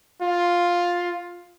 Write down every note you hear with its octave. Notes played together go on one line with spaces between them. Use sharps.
F4